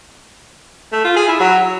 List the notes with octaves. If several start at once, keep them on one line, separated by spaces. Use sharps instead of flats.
A3
F4
G#4
E4
F#3